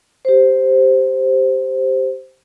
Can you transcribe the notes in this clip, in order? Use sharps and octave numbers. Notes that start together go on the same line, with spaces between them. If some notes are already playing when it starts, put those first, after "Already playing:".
G4 C5